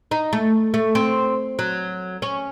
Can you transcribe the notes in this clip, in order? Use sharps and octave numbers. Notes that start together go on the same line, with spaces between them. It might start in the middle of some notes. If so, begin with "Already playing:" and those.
D#4
A3
A3
C4
F#3
C#4